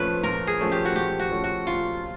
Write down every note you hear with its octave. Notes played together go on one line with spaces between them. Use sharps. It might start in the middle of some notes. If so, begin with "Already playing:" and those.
Already playing: A#2 F3 A3 C#4 B4
A#2 A#4
G#4
F3 A3 C#4
G4
F#4
A#2 G4
F#4
F3 A3 C#4
F#4
A#2 F4